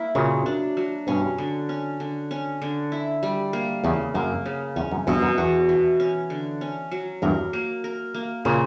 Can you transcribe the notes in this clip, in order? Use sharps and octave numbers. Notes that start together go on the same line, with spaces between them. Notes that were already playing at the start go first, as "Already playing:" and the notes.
Already playing: A#3 E4
A#2 C#3 F#3
D4
F#3
G2 B2 C#4
D3
C#4
D3
C#4
D3
E4
G3
A#3
E2 C#3
F#2 A#3
C#3
E2 C#4
F#2
E2 G2 B2
F#2
E2 F#4
E3
C#4
D3
C#4
F#3
E2 G2 A#4
A#3
A#4
A#3
A#2 C#3 A#3